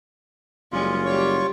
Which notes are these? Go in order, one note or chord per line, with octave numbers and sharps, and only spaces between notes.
F#1 G3 G#3 C#4 F4
G3 G4 C#5 C#6